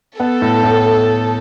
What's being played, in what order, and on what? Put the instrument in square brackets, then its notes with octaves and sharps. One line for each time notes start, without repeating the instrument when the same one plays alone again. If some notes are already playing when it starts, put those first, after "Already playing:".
[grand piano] B3 [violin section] A4
[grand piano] A2
A2